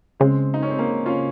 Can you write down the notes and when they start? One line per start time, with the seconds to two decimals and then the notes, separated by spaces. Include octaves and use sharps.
0.20 C#3 G#3 C4
0.54 D#4
0.62 C#4
0.71 C4
0.79 A#3 C#4
1.06 C#4 F4